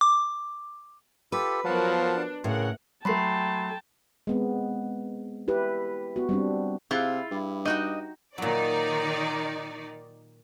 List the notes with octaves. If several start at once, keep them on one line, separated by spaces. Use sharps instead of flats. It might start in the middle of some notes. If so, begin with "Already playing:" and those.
D6
F4 G4 A4 B4
F3 F#3 B3 A#4 F5 F#5 A5
D4
A2 C#3 A#4 F#5 C6
F#3 A3 G5 A5 B5 C6 C7
G#3 B3 C4
E4 G4 B4
B3 F#4
G3 C4 D4
C3 E4 F4 G#4 F5 F#6
G2
D#4 F#4 D#5 G5
A#2 D#3 F#3 D#4 D5